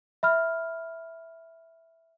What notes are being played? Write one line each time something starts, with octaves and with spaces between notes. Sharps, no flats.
E5 B5 F6